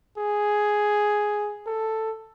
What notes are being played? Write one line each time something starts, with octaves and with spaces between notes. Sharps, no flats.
G#4
A4